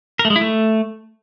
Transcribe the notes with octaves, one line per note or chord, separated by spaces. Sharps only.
A#4
A3
G#3
E4
A3